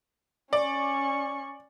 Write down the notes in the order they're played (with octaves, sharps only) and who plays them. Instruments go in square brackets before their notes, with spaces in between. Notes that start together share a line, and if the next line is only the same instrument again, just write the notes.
[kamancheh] C#4 C#6 [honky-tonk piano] D5